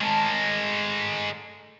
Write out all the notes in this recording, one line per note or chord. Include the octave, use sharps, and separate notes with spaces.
G#3 A3 A#4 C#5 A5